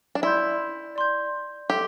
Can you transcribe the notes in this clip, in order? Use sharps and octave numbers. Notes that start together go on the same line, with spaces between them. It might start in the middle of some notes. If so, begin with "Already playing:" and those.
D4
E4 D5 C6 G6
D5 C6 G6
G4 A4 E5 C6